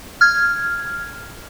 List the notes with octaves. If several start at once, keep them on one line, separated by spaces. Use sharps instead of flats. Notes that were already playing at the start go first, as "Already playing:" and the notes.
F6 G#6